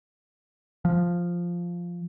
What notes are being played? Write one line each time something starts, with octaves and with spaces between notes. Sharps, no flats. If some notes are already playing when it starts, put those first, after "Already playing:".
F3